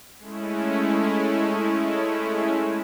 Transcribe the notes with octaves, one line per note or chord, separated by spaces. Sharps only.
G#3 A3 C#4 E4